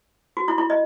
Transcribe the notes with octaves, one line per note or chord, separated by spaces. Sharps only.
F#4
E4
E4
D#5